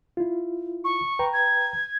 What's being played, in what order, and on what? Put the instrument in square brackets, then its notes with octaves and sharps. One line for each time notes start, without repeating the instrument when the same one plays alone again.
[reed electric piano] E4 F4
[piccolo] C#6
[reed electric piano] B4 G5 A#5
[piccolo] G#6